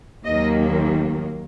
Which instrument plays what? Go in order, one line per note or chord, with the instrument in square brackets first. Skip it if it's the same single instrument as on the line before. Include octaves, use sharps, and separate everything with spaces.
[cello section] D#2 D#3 F#3 A#3 D#5